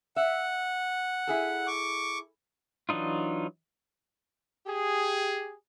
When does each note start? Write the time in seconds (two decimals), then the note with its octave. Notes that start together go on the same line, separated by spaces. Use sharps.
0.16 E5 F#5
1.27 E4 G#4 A4
1.67 C#6 D6
2.89 E3 F#3 D4 D#4 F4
4.66 G4 G#4